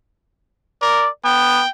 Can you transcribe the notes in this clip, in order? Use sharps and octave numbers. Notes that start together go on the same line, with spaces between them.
A#4 D5
B3 G5